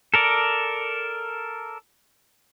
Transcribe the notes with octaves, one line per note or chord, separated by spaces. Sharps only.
A4 A#4 D5